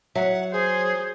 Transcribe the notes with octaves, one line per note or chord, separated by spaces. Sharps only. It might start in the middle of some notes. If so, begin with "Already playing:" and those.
F#3 E5 F#5
G#4 C5